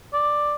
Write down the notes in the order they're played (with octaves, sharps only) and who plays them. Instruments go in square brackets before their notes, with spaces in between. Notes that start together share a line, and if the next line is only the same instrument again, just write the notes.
[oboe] D5